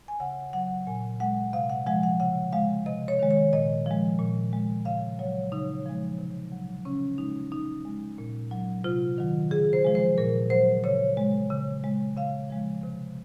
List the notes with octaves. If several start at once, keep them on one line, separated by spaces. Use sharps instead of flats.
G#5
C#3 F#5
F#3 F#5
A#2 G#5
G#3 F#5
C3 F5
F#5
F3 G#3 F#5
F#5
C#3 F#5
G#3 F5
C3 D#5
C#5
D#3 G#3
C#5
A#2 D#5
F3 G#3
A#2
G#3
C#3 F5
F#3 C#5
C#3 D#4
F3 G#3
C3
F#3
C#3 C#4
G#3 D#4
C#3 D#4
G#3
A#2
F#3
C3 F4
D#3 F#3
C#3 G#4
C5
F3 G#3
C5
A#2 A#4
F#3 C5
C#3 C#5
G#3
C#3
G#3
C#3 F5
F3 G#3
C3